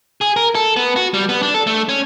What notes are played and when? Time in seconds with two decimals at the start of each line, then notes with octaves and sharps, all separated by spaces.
0.21 G#4
0.36 A#4
0.55 A4
0.76 B3
0.96 F#4
1.14 G3
1.29 B3
1.43 D4
1.54 A4
1.67 A3
1.89 C#4